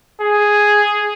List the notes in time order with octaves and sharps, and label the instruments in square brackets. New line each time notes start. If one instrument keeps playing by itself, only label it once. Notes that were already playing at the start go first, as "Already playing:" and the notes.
[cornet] G#4